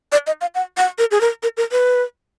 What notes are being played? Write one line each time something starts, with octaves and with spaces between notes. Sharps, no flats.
D5
D#5
F5
F#5
F#5
A#4
G#4
A#4
A#4
A#4
B4